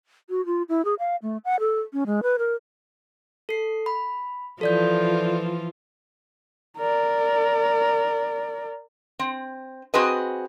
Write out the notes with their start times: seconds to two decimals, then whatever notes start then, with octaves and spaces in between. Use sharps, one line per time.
0.30 F#4
0.46 F4
0.69 E4
0.85 G#4
0.99 F5
1.22 A3
1.45 F#5
1.60 A4
1.93 C#4
2.06 G#3
2.23 B4
2.38 A#4
3.49 A4 C7
3.86 B5
4.61 E3 F3 F4 A4 D5 G6
6.78 A#4 D5
9.19 C4
9.94 C4 F#4 G#4 B4 D#5